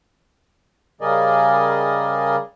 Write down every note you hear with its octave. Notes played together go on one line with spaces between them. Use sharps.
C#3 G3 G#4 A#4 D5 D#5